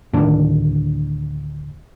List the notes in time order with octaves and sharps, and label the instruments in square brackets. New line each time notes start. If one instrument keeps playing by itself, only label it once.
[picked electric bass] D2 A2 D#3 D4